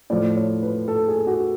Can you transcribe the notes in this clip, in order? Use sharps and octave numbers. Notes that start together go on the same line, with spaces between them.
A2 F3 D5
C#5
B4
A4
G#4
F#4